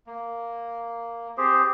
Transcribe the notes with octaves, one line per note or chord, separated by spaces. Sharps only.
A#3
C4 G4 G#4 C5